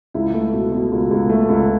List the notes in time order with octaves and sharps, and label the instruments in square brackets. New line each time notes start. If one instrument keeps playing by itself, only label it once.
[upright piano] C#2 E4
A3
B2
B2
C#2
C#2
A3
C#2